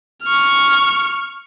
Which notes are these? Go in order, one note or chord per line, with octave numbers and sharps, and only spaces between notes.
C#6 F6